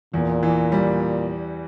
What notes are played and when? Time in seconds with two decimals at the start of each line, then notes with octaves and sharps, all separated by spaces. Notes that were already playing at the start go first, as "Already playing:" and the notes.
0.14 E2 A#2
0.43 E3
0.72 G3